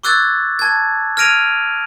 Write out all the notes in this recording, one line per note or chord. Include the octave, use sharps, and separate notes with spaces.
C#6 D6 E6 F#6 G#6 A6
A5 G#6
F6 G#6 A#6 D7 D#7 F7